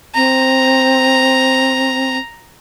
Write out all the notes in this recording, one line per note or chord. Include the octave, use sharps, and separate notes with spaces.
C4 A#5